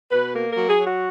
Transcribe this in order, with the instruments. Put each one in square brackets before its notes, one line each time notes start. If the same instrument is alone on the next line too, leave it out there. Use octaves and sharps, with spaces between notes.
[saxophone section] B2 B4
A#3 A#4
A#4
F#3
G#4
F#3
F#4